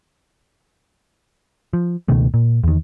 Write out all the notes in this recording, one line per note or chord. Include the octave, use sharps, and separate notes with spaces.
F3
C#2 B2 D#3 A3
A#2
E2 D#3